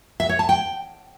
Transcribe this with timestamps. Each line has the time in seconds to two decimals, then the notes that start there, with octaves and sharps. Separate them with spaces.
0.20 E5
0.29 C#5
0.39 A5
0.49 G5